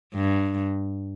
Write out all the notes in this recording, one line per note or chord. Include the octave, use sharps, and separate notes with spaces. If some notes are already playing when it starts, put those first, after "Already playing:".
G2